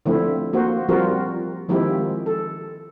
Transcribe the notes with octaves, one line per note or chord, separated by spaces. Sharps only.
D3 F3 A3 C4 E4
A#3 F#4 C5
F3 G3 C4 F4 F#4 A#4
D#3 F3 G#3 C4 E4 G4
A4